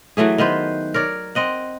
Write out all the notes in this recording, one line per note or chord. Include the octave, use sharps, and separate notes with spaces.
E3 F#3 A3 G#4
D#3 B3 B4 C5
A#4 C#5 D5
C4 D#5 F#5